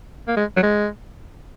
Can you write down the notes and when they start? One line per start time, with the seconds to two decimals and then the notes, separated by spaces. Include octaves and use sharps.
0.28 A#3
0.36 G#3
0.57 F#3
0.63 G#3